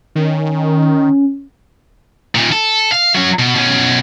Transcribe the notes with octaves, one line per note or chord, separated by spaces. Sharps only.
D#3 C#4
A#2 D#3
A4
F5
F#3 C#4
B2
B2 C#4